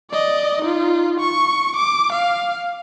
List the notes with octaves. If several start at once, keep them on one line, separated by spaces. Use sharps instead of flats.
D5 D#5
D#4 F4
C#6
D6
F5